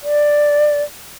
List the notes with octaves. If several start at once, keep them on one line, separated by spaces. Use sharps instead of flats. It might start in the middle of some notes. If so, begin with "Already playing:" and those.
D5